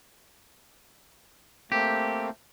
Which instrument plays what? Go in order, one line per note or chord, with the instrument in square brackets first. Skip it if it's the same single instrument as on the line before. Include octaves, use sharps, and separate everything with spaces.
[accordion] A3 A#3 C4 [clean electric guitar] G4